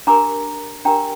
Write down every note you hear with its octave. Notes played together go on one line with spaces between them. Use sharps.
D4 G4 A#4 A#5 D6
D4 G4 A#4 G5 A#5